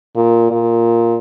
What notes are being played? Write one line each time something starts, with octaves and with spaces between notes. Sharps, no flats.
A#2
A#2